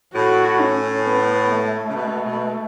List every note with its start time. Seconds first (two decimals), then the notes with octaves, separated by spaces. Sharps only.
0.15 A2 F#4
0.60 C#4
1.05 B3
1.51 A3
1.89 C#3
1.96 B2
2.25 B2